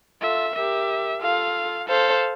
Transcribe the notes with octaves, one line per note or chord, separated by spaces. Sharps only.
F4 A4 E5
G4 A#4 E5
F4 A4 F5
A4 C5 F5